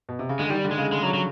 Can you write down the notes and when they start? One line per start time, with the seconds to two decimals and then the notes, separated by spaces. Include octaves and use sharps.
0.09 B2
0.19 C3
0.29 C#3
0.39 D3 G#3
0.50 D#3 G3
0.65 D3
0.71 G#3
0.78 C#3
0.92 G#3
1.03 F#3
1.14 F#3